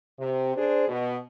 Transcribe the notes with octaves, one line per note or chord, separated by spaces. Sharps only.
C3
D4 G#4 C5
B2